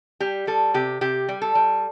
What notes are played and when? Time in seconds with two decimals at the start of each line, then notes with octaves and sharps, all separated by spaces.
0.20 G3 G4
0.47 G3 A4
0.74 C3 G4
1.01 C3 G4
1.29 G3
1.42 A4
1.55 G3